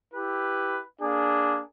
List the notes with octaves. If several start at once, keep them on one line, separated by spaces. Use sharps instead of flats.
E4 G4 B4
A#3 D4 G#4